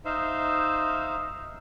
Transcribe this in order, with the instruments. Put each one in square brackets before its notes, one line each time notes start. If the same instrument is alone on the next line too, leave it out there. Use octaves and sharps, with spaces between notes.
[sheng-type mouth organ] D#4 C5 E5 F5